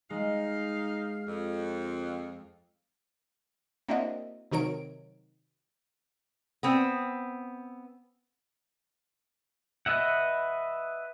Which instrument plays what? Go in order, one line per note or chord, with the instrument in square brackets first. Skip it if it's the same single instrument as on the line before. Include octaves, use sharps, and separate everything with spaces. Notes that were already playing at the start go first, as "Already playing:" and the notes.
[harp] G#3 [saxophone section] D#4 F5
[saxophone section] F2
[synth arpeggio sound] A#3 C4 D4 E4 F#4 D#5
C3 D#3 F#3 A#4 C#5 D7
[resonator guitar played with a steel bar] B3 C4
[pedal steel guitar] B4 D#5 E5 F#5